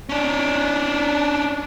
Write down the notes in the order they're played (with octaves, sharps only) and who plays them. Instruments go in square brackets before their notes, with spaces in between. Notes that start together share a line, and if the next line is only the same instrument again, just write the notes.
[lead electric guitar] C#4 D4